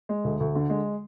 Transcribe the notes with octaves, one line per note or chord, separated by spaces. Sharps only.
G#3
D2
D2
D3
G#3